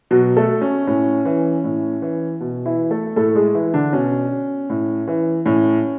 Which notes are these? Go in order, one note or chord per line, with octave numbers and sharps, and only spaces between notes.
B2 F#3 F#4
A3 A4
C#4
A2 C#4
E3
A2
E3
B2
E3 E4
A3 A4
A2 A3 A4
G#3 G#4
E3 E4
D3 D4
B2 C#4
A2
E3
A2 C#4